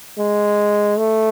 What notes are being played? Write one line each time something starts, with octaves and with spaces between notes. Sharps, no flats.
G#3
A3